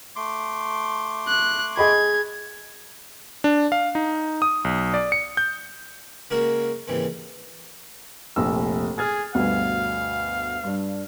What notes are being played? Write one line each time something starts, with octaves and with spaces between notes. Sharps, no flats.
A3 C6 D6
F#6
G#4 D#5 B5 G#6
D4
F5
D#4
D#6
B1
D5
C#7
G6
C#3 G#3 A#3 C#4 F#4 A#4
D#2 G#2 C#3 E3 C4
F1 A#1 E6
G#4 F6 G#6 A6
D2 G2 B2 F5
G2 D4